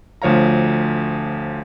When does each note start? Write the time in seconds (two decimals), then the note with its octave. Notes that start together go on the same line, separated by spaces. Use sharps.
0.22 D2 F3 C#5 F5 A#5